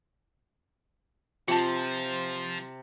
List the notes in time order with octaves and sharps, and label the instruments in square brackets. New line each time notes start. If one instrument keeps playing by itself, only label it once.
[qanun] C3 [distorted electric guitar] F3 [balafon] F4 A5